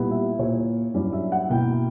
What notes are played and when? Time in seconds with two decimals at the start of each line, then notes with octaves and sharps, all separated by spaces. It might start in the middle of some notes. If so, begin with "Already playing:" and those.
Already playing: A#2 G3 B3 E4
0.11 E5
0.39 A#2 A#3 E4 C#5
0.94 G2 F#3 C#4 E4 D5
1.12 E5
1.32 F#5
1.50 B2 A#3 E4 G5